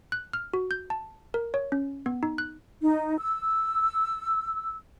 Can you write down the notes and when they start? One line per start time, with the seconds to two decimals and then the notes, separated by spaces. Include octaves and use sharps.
0.12 F#6
0.33 F6
0.53 F#4
0.71 G6
0.90 A5
1.34 A#4
1.54 C#5
1.72 C#4
2.06 B3
2.23 D#4
2.38 F#6
2.81 D#4
3.18 E6